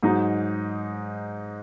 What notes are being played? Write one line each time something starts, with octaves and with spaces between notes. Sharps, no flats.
G#2 F#3 D#4